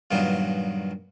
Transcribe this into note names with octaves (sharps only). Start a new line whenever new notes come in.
G2 A#2 D#3 F#3 B3 F4